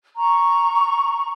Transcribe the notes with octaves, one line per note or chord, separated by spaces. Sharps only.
A#5 C#6